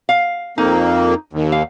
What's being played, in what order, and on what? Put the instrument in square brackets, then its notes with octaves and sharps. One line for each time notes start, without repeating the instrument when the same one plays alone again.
[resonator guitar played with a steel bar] F5
[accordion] F2 A#3 [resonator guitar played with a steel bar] D#4
[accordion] D#2
[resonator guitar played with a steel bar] F5